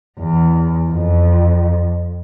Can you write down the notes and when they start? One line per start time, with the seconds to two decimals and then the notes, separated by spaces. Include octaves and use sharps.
0.19 E2
0.92 F2